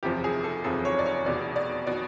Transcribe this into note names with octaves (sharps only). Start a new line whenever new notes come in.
F#1 E2 C3 F3 G4
G#4
A4
F#1 E2 C3 F3 A4
C#5
D5
C#5
F1 E2 B2 D5
D5
B2 D5